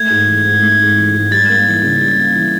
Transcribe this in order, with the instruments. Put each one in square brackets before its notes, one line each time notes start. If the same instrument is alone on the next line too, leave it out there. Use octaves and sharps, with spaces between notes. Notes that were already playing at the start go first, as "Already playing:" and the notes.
Already playing: [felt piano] A3 [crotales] G#6
[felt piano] G#2
E3
G#2
A3
G#2
E3
G#2
[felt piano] G3 [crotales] A6
[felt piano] A#3
E3
C#3
G3
A#3
E3